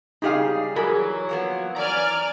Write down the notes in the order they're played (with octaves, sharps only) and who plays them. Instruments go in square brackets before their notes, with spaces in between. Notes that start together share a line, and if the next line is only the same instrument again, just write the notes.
[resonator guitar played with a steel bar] C#3 G3 G#4 [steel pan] D#4 G4 F5
[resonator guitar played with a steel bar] E3 [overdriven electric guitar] F#3 [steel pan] G#4 A#4 B5
[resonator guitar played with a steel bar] F3 A#3 B3
[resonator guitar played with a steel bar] E3 [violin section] D5 G#5 F6 [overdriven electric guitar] A#5